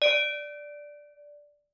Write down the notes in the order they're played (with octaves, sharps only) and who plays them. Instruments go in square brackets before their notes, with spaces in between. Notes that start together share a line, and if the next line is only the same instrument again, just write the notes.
[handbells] D5 D7